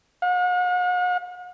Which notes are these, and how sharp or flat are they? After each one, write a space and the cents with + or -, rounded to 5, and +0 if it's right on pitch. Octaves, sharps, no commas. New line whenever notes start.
F#5 -45